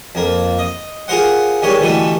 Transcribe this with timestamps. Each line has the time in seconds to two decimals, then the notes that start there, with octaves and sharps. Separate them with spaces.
0.15 F2 A#3
0.59 D#5
1.08 F4 G#4 A#4 C5 F#5
1.62 D#3 G3 G#3 G4 C#5
1.80 B2 D3 E3 G3 A3